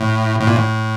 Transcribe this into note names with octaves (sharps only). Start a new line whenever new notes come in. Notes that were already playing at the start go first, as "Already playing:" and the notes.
Already playing: A2
A2
A#2
A2